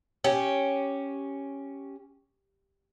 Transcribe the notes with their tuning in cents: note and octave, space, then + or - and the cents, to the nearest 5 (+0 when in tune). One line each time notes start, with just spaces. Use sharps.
C#4 +0 G4 +0